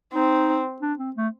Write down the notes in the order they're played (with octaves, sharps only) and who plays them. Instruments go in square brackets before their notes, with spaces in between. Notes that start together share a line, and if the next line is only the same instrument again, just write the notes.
[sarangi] C4 [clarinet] D#4
[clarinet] D4
C4
A3